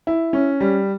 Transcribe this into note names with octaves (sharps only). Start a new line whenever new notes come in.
E4
C#4
G3